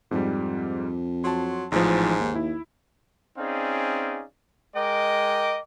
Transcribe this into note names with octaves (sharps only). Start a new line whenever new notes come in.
F2 G#2 G3
F#3 A5 C6
A1 G#2 E3 F3
D#2
E4
C4 C#4 D#4 G#4 D5 F5
G#3 A#4 D#5 G5 D6